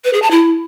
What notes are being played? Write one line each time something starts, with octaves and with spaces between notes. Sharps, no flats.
B4
G#4
A5
E4